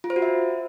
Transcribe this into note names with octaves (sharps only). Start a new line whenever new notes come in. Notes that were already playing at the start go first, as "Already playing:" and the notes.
F4
C5
F#4
E5